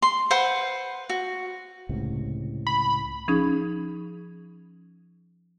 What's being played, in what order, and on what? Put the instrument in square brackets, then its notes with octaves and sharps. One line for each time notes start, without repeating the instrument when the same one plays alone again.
[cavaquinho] C6
B4 C5 F#5 B5
F#4
[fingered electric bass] C#2 A2 C3
[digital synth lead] B5
[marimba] F3 C#4 D#4 G#4 G#6